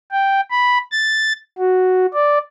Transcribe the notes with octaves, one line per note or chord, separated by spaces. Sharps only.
G5
B5
A6
F#4
D5